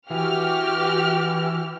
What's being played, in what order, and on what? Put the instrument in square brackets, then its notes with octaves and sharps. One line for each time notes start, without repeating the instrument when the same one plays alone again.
[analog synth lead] E3 [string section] F#4 G4 F6